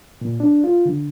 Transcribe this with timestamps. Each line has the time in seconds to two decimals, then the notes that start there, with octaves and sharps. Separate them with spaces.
0.21 A#2
0.40 D4
0.64 F4
0.86 D3